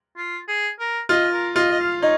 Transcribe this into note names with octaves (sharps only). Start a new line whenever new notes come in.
F4
G#4
A#4
F4 D#5
A#4
F4 D#5
D#5
F5
D#4 C#5